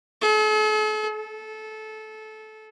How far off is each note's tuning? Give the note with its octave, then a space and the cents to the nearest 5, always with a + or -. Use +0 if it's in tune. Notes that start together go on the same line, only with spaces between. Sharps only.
A4 -45
A4 -20